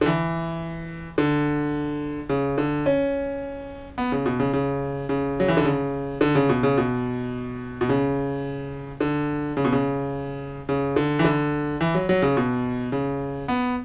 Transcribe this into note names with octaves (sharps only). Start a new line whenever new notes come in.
D3
E3
D3
C#3
D3
C#4
B3
C#3
B2
C#3
C#3
C#3
F#3
E3
D3
C#3
D3
C#3
B2
C#3
B2
B2
C#3
D3
C#3
B2
C#3
C#3
D3
E3
D3
E3
F#3
F#3
C#3
B2
C#3
B3